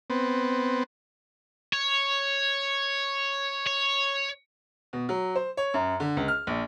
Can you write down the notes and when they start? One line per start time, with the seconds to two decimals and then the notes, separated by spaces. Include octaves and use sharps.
0.10 B3 C4
1.73 C#5
3.67 C#5
4.93 B2
5.09 F#3
5.35 C5
5.57 C#5
5.74 F#2
6.00 D3
6.17 C#2
6.28 F6
6.47 A#1